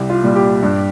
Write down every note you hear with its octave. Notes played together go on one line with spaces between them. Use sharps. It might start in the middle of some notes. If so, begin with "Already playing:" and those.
Already playing: C2 G4
F4
A#2 G3
G4
G2